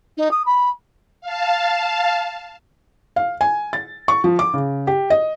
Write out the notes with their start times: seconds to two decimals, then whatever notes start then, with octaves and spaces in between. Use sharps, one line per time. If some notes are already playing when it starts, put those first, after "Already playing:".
0.17 D#4
0.31 D#6
0.46 B5
1.21 F5 A5
3.16 F5
3.41 G#5
3.73 A6
4.08 C#6
4.24 F3
4.39 D6
4.54 C#3
4.87 G4
5.10 D#5